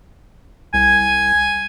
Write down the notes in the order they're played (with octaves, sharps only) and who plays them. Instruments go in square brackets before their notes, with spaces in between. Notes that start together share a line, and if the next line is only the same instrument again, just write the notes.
[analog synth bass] C2 [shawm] G#5